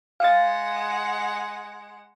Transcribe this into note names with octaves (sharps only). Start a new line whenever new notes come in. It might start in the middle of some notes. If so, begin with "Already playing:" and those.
G#3 F5 F#5 A6